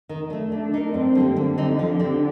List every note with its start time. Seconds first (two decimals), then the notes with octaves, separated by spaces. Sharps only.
0.09 D#3
0.30 A3 D4
0.52 A3 D4
0.74 D#4 A#4
0.94 G2 C4
1.15 D3 G3 A#3
1.36 D3 G3
1.58 C4 D#4
1.79 F3
1.99 C4 G4